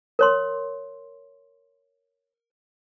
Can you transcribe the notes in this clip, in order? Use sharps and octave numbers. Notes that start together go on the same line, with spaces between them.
A#4 C#5 C6